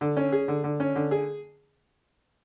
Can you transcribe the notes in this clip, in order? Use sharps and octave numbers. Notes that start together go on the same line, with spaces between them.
D3
C#4
G#4
D3
D3
C#4
D3
G#4